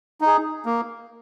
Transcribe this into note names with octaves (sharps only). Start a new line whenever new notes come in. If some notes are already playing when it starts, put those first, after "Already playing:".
D#4
G#4
A#3